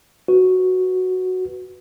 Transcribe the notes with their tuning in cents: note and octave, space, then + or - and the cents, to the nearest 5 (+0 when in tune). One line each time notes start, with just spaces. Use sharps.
F#4 +0 B4 +0